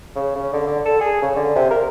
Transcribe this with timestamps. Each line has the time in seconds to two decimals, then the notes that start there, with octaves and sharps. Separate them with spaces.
0.15 C#3
0.35 C#3
0.53 D3
0.67 D3
0.85 A4
1.01 G#4
1.22 C#3
1.36 D3
1.55 C3
1.70 A#4